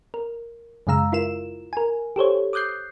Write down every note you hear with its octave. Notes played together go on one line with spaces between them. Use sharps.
A#4
F#2 C#3 G#3 F5 A#5 E6
E4 F4 A#4 E7
A#4 G#5
G4 A4 C5 C#5
D6 D#6 F#6 G6 C7